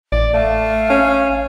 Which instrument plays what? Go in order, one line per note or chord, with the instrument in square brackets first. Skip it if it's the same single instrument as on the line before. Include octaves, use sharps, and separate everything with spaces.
[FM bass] A1 [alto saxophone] D5
[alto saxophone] A3 [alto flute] F5
[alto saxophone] C#4